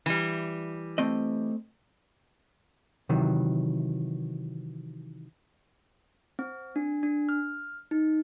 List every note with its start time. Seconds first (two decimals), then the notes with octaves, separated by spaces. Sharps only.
0.06 E3 G3
0.98 A3 C4 D#5
3.09 C3 D#3 E3 F#3
6.39 C4
6.76 D4
7.03 D4
7.29 F6
7.91 D#4